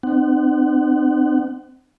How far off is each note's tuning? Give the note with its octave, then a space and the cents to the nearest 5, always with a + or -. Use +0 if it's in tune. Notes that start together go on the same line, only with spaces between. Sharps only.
C4 -15 D#4 -45 F#5 +25